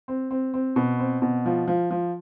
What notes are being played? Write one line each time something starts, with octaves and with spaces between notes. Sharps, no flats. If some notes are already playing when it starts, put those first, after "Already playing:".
C4
C4
C4
B2
C4
B2
F3
F3
F3